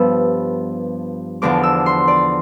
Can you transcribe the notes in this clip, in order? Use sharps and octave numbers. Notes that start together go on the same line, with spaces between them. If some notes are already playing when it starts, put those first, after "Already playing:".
Already playing: G2 F3 B3 E6
E2 D3 F3 D6
E6
C6
D5